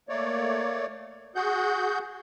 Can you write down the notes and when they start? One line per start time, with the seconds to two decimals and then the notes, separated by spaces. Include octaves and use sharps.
0.09 A3 A#3 C#5 D5
1.35 F#4 G#4 F#5 G6